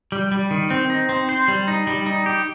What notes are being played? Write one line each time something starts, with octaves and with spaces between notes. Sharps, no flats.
G3
G3
D#3
C4
D#4
C4
C5
G3
D#4
G3
D#4
G4